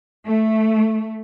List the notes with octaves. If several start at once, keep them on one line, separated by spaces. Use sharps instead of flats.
A3